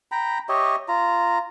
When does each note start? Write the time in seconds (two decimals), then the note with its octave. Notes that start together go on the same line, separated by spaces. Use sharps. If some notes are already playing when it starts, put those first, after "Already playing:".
0.12 G5 A#5 B5
0.49 G4 C#5 D#5 E5
0.88 F4 A#5